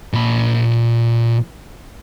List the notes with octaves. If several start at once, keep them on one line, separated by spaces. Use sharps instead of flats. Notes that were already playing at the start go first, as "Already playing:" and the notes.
A#2 B5